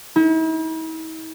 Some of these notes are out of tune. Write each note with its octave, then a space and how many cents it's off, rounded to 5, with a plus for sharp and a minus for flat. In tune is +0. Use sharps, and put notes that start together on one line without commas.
E4 -45